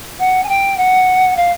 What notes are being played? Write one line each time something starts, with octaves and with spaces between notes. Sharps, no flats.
F#5
G#5
G5
F#5
F5